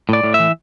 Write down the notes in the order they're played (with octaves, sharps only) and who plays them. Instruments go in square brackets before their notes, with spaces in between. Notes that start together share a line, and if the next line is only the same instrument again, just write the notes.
[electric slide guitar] A2 D5
A2
E5
E3